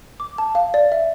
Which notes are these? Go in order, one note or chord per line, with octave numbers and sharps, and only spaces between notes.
D6
A5
F5
D5
E5